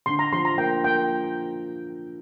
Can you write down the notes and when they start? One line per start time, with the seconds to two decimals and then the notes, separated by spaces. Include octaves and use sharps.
0.06 D3 C6
0.19 A#5
0.33 F3 C6
0.45 A#5
0.58 A#3 G5
0.84 A#3 G5